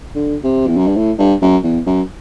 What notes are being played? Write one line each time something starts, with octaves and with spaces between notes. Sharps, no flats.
D3
C3
E2
F#2
G2
A2
G2
F#2
E2
F#2